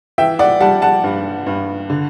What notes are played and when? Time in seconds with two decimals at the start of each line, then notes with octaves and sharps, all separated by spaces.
0.18 E3 E5 G5
0.39 D5 F#5
0.61 G3 F#5 A5
0.82 F#5 A5
1.04 G2
1.46 G2
1.90 D3